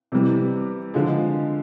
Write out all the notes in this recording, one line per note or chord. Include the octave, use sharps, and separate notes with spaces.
C3 E3 G3
D3 F3 G#3